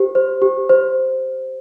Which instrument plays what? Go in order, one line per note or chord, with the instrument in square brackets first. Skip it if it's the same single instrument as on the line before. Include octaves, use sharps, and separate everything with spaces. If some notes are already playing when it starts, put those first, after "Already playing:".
Already playing: [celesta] G4 C5
C5
G4
C5